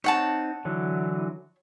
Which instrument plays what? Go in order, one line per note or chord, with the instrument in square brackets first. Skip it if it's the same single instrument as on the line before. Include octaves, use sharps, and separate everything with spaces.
[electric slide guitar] C4 D#4 [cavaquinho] C#5 F#5 A5
[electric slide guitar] D3 E3 F#3